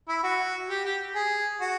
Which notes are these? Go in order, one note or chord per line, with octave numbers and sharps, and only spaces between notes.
E4
F#4
G4
G4
G#4
F#4